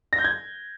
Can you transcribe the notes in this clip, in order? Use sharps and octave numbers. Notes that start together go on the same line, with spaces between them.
A#6
G6
G#6